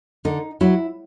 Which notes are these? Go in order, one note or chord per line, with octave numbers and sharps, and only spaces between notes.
D3 D#4
F#3 E4